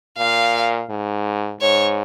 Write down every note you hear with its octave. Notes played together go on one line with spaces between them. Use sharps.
A#2 F5
G#2
G#2 C#5